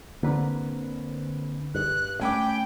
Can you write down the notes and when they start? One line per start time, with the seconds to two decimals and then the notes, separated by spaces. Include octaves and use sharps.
0.23 D3 A#3 C4 D4 B4
1.75 G2 F#6
2.21 A3 C#4 G5 G#5 B5 D6